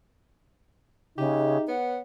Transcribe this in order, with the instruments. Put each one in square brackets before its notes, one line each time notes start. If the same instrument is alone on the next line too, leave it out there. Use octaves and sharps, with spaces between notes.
[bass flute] C#3 [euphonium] D#4 [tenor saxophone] G4 [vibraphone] G#4 D#5 E5
[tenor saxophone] B3 [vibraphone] C#5 [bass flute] F#5